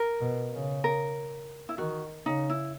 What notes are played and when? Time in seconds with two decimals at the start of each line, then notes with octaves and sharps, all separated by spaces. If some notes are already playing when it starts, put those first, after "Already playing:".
Already playing: A#4
0.21 B2
0.52 C#3
0.84 A#4
1.69 E4
1.78 D#3 F#4
2.25 C#3 D#4
2.50 E4